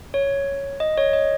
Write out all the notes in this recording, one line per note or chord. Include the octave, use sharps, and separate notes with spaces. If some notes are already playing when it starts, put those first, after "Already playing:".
C#5
D#5
C#5
D#5